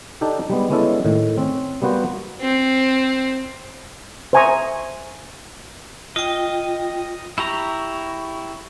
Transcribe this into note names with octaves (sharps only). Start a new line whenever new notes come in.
D4 D#4 G4 A4
G3 G#3 B3
G#3 B3 C#4 D4 E4 A4
A2 D#3
C4 C#4
G3 A#3 B3 F#4 C5
C4
C5 E5 G#5 A#5 C#6 D#6
F4 D#5 G5
E4 G4 A#5 C#6